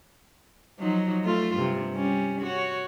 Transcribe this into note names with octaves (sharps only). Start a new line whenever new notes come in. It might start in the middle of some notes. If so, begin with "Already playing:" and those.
F3 F#3 D#4
A3 F4
G2 C3
G3 C#4
F#4 C#5